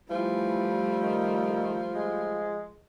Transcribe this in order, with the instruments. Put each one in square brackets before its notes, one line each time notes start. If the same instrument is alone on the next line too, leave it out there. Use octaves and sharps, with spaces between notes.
[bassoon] E3 [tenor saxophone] F3 [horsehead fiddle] G3 A3
[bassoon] D#3
G#3